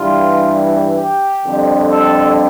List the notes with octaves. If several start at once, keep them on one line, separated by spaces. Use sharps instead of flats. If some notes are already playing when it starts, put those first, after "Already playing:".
Already playing: G2 E3 G3 F4
G4
F2 D3 G3
A4